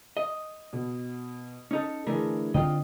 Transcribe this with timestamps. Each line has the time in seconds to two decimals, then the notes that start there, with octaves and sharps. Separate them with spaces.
0.17 D#5
0.73 B2
1.71 C#4 D#4 A4
2.07 D3 E3 A3 G#4 A#4
2.54 D3 C4 F4 D#5 G5